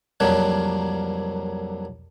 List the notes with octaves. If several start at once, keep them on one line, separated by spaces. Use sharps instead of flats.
C2 F2 F#3 A#3 D4 C#5